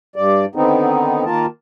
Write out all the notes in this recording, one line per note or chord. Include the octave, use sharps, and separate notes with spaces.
G2 D5
D3 D#3 B3 C4 D#4
D#3 A#3 F4 A#4 A5